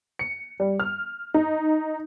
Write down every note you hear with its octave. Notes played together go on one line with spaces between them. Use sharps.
C#7
G3
F6
D#4